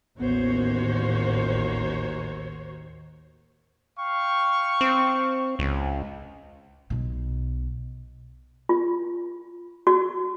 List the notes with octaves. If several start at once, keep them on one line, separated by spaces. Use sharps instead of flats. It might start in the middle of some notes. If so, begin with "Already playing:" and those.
A1 D#2 D#3 B3 F#4 C5 C#5
F5 G5 C#6
C4
C#2
B1 B2
F4
F#4